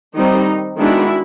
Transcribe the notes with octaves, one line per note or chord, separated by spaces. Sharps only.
D#3 G3 C4 D#4
D#3 G#3 B3 D4 E4 F#4